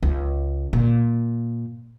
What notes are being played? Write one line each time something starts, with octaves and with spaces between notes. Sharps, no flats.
C#2
A#2